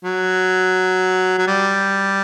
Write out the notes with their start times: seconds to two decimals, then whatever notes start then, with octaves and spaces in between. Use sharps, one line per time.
0.04 F#3
1.38 F#3
1.48 G3